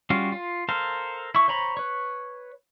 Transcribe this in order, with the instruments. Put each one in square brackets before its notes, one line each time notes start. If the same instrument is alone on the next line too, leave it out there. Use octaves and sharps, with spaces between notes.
[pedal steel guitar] G3 C#4 F4 F#4 F5
F4
A4 A#4 C5 F5
E4 C#6
C5 C#5 A#5 B5
B4 C#5